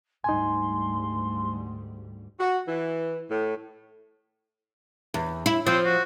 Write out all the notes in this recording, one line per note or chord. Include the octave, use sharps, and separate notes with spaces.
D2 G#2 G3 D#4 G#5 C6
F#4
E3
A2
E2
E4
F3 C4
F#4